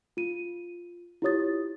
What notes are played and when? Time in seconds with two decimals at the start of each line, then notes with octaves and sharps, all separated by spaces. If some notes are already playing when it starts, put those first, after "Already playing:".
0.17 F4 D#7
1.22 E4 F4 G4 C#5 D#6 A6